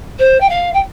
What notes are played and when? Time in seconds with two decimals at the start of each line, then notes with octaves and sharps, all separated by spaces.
0.19 C5
0.40 G5
0.49 F5
0.74 G5